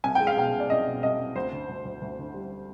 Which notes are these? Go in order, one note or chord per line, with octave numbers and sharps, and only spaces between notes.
C2 G#5
G5
G#3
F5
B2 G5
B2
D5
C2 D#5
B2
C2 D#5
C2
D2 C5
D3
D2
D2
D2
D3
G3